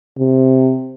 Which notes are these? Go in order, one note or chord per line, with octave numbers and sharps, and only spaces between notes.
C3